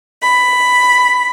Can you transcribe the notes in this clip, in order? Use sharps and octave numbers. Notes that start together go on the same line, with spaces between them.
B5